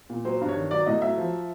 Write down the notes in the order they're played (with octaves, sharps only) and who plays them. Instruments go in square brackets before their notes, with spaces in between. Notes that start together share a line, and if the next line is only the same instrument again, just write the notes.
[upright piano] A#2
F#3 C5
G2
C#5
D#3
F#3 D5
A2 D#5
F#3 E5
F3